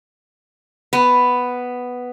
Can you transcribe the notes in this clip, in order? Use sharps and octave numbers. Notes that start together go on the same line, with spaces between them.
B3